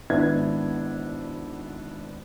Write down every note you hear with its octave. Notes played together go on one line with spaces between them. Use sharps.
G#1 B3 D4 E4 G#6